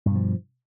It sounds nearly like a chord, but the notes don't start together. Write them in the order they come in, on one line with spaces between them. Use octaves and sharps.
G2 B2 F3